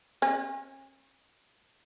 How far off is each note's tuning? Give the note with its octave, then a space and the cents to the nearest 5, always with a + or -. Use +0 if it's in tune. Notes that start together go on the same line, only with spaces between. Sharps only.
C#4 -40